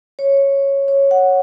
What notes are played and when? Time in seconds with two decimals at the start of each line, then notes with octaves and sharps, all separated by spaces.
0.19 C#5
0.88 C#5
1.11 F#5